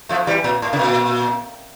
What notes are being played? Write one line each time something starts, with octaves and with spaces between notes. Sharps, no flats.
F3 A3
E3 G3
A#2
A2
C#3
A#2